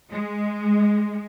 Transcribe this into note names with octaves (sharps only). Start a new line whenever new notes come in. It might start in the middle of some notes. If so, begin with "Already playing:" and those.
G#3